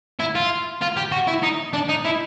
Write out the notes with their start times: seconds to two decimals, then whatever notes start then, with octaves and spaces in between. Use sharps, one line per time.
0.20 E4
0.35 F4
0.82 F4
0.97 G4
1.12 F#4
1.28 E4
1.43 D#4
1.73 D4
1.89 D#4
2.05 E4